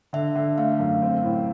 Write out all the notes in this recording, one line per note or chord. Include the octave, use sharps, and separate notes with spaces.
D3 E5
D3
A3 F5
F#2
C4
A2